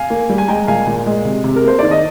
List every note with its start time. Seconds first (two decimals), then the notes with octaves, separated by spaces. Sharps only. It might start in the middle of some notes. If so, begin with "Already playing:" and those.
Already playing: F5 G#5
0.10 A#3
0.29 G3
0.38 G#5
0.48 G#3 G5 A#5
0.67 A#2 F5 G#5
0.87 A#2
1.06 G#3
1.25 C3
1.44 C3
1.56 A#4
1.64 A#3 C5
1.79 D#3 D5
1.91 D#5